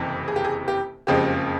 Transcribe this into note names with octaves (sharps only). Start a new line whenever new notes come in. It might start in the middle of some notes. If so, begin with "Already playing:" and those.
Already playing: F#1 F2 C3 E3
G#4
G4
G#4
G4
F#1 F2 C#3 F3 G#3 G4